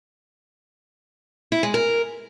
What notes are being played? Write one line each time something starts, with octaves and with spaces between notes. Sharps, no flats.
E4
G#3
A#4